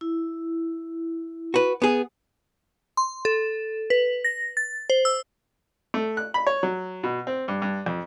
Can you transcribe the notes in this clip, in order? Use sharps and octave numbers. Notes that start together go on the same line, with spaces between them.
E4
F#4 B4
B3 G#4
C6
A4
B4
A#6
A6
C5
E6
A3
F#6
B5
C#5
F#3
B2
C4
G2
G2
F2